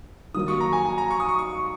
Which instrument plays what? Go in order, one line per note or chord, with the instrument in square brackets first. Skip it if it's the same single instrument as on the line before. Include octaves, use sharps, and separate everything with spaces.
[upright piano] D#3 F#3 A#3 D#4 [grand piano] D#6
[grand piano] C#6
A#5
G#5
G#5
A#5
C#6
D#6
C#6
C#6